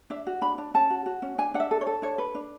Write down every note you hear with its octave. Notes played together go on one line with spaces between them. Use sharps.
D4 E5
F#4
D4 B5
D4
C#4 A5
F#4
F#4
C#4
D4 G#5
D4 F#5
E5
A4
C#5
A4
D4 C#5
B4
D4